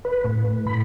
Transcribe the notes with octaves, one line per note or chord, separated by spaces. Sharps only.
B4
A2
B5